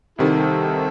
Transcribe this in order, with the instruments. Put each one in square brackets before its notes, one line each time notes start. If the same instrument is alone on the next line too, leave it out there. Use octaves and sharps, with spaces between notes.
[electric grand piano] C2 C3 D#3 [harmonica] E4 A4